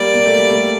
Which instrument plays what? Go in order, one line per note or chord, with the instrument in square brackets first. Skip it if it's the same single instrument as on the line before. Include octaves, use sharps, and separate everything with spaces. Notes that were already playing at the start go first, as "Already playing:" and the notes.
Already playing: [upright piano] G3 A#3 [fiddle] D5
[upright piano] A#3
A3
G3
A3